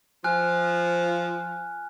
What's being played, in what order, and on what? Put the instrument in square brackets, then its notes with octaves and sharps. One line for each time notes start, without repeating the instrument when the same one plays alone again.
[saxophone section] F3 [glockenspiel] G#5 F6 F#6